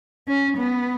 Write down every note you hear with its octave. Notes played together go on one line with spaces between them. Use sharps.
C#4
B3